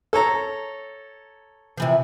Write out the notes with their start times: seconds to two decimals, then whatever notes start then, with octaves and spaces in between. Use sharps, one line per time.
0.13 A4 C#5 A#5
1.77 C3 E3 F3